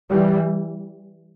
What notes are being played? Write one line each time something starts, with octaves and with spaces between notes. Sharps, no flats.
E3 G3